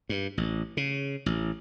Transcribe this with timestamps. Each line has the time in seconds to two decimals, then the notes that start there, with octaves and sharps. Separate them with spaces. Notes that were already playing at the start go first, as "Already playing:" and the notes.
0.09 G2
0.37 A1
0.77 C#3
1.26 A1